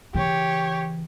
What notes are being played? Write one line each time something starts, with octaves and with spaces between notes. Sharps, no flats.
C#3 E3 G4 C#5